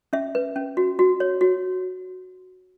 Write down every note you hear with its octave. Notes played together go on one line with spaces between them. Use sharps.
C#4 E5
B4
C#4
F#4
F#4
C#5
F#4